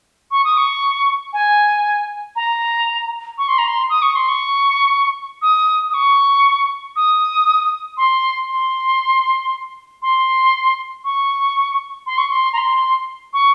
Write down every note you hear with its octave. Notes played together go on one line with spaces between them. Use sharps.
C#6
D#6
C#6
G#5
A#5
C#6
C6
A#5
C6
D#6
C#6
C6
C#6
D#6
D#6
C#6
D#6
C6
C6
C6
C#6
C6
C#6
C6
A#5
C6
C#6